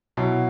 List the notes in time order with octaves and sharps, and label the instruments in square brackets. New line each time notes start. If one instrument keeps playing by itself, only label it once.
[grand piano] B2 F#3 E4